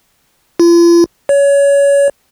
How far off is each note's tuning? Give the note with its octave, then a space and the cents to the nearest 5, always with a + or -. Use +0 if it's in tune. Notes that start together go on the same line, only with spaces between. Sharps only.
F4 -40
C#5 +25